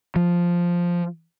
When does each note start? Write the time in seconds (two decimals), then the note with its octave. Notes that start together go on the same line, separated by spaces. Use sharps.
0.16 F3